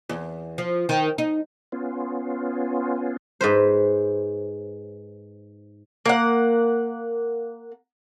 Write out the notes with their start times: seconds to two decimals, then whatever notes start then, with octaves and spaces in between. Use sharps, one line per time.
0.09 E2
0.58 F3
0.89 D#3
1.18 D#4
1.72 B3 C#4 F4
3.41 G#2 B4 C5
6.06 A#3 F#5